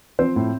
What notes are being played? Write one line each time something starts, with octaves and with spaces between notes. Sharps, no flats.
F3 C4 C5
A2